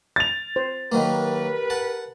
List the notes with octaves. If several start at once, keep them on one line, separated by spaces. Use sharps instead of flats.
A6 F7
C5
D#3 F#3 A#3 G4 A#4 B4
F#5 A5